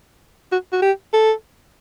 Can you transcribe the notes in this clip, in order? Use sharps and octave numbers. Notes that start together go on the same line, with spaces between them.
F#4
F#4
G4
A4